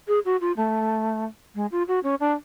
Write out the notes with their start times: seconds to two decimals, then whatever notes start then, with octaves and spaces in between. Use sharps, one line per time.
0.08 G#4
0.25 F#4
0.41 F4
0.57 A3
1.55 G#3
1.72 F4
1.88 F#4
2.04 C#4
2.20 D4